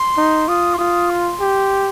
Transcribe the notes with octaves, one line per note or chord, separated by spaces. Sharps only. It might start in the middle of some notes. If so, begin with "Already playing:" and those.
Already playing: C6
D#4
F4 D#6
C6
F4 D#6
C6
G4